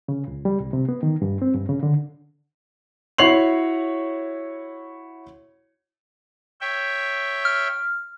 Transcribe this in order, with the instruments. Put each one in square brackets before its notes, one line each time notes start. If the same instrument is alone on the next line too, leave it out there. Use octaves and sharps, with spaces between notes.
[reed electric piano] C#3
C#2
G3
C2
C3
B3
D#3
G2
C4
G2
C#3
D3
[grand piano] E4 F#4 C#5 C7 F7 F#7
[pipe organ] C#5 E5 G5
[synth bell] F6